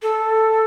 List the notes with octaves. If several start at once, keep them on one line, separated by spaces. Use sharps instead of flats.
A4